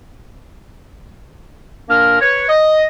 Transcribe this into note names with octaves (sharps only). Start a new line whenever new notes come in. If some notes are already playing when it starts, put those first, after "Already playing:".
A#2 A#3 D4 A#4 F6
B4 C#5
D#5